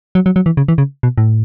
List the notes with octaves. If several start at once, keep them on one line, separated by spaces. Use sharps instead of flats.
F#3
F#3
F#3
E3
C#3
E3
C#3
B2
A2